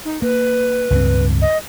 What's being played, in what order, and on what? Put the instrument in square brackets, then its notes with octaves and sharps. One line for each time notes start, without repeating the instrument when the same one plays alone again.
[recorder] D#4
[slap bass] A#3 [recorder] B4
[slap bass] C#2 G2 C4
[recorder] D#5